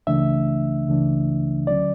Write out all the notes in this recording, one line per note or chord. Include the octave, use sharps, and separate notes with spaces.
C#2 C#3 E3 A3 D4 E5
C#2 C#3 E3 A3 D4
D2 D3 F#3 C#4 D5